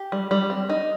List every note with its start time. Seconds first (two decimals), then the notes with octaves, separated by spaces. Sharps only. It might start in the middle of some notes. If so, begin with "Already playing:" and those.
Already playing: G4
0.12 G3
0.31 G3
0.50 C4
0.69 D#4